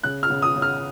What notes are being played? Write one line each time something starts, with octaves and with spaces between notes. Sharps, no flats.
C#3 F#6
F6
C#3
D#6
C#3
F6